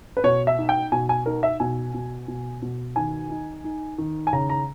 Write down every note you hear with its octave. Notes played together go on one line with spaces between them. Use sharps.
B4
B2 C#5
E5
D#4
G5
B2 G#5
G#5
D#4 A#4
E5
B2 G#5
B2
B2
B2
D#3 G#5
D#4
D#4
D#3
G#5
C#3 A#5
A#5